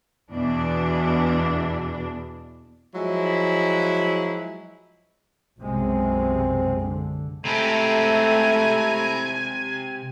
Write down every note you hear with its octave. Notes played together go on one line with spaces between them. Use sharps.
E2 B2 E3 D4
F3 F#3 G#3 E4
B1 F#2 C3 G#3 C4
D3
C3 G#3 A3 E4 G4 A4 G#5 A#5